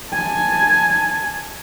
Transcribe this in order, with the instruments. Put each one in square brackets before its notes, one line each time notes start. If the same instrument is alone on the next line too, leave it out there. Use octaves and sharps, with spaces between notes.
[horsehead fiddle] G#5 A5